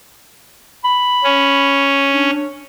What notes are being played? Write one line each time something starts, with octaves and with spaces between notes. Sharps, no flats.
B5
C#4
D4